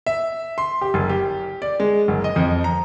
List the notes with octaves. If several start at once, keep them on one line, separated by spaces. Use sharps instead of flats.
E5
C6
G4
F#1
G4
D5
G#3
F#1
D#5
F2
A#5